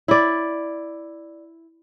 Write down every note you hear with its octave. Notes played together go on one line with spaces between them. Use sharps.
E4 D5